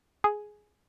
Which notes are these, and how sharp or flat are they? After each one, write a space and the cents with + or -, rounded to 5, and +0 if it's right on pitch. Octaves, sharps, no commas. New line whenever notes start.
G#4 +10